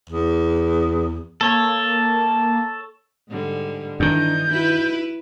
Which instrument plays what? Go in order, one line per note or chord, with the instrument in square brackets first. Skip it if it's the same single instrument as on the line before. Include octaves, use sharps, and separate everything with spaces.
[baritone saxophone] E2
[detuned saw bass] A#3 [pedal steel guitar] A4 C#5
[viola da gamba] G#2 D3 G3
[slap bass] G2 D#3 [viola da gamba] E3 D#4 [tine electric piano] D4 [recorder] G6
[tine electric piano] D#4 F#4 [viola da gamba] E4 B4